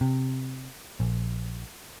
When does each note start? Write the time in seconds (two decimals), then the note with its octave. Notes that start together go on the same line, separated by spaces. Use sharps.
0.01 C3
1.00 A#1